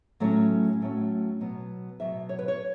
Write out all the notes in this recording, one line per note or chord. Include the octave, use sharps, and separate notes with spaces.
A2 F#3 A3 C#4 F#5
A2 F#3 A3 C#4
B2 F#3 B3
B2 F#3 B3 E5
C#5
B4
C#5